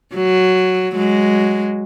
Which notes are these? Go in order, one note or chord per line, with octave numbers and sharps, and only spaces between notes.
F#3
F#3 G#3